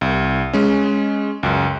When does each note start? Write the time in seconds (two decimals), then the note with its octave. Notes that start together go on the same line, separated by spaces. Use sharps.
0.01 C2
0.53 G#3 C#4
1.43 C#2 F#2